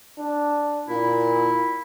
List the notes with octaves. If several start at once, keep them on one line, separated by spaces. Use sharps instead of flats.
D4
A#2 E4